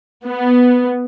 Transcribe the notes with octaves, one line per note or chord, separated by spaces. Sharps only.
B3